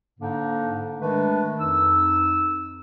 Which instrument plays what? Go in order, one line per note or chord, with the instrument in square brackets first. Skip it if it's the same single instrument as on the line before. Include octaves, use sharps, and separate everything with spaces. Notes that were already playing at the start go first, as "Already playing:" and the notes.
[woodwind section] G#2 D3 A#3 D4 D#4
D#3 G#3 A3 D4 B4
F2 D#4 E6